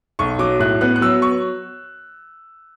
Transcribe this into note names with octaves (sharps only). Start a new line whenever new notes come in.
B1 C#6
F#3 D6
A2 F#6
B3 F#6
F#6
F#3 E6
C#6